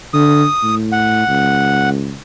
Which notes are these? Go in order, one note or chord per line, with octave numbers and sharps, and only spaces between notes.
D3 D#6
A2
F#5
C#2